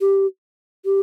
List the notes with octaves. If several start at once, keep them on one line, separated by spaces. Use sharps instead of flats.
G4
G4